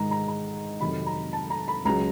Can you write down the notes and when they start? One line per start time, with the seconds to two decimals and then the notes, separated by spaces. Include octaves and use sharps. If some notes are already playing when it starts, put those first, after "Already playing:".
Already playing: G#2 D#3 G#3 A#5
0.11 A#5
0.28 A#5
0.81 F2 C3 D#3 F#3 B5
1.07 A#5
1.33 A5
1.50 A#5
1.68 B5
1.85 C#2 C#3 F#3 A#5